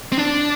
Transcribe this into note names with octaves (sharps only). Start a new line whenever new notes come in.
C4
D4